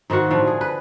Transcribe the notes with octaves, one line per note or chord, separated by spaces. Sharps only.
G#2 D#3 A#3 F#4
A2 D3 F3
G#4
B4